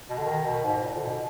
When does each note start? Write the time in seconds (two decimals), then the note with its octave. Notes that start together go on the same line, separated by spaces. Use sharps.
0.10 B2
0.18 D3
0.25 D#3
0.45 B2
0.64 G#2
0.84 A#2
0.96 D3
1.04 B2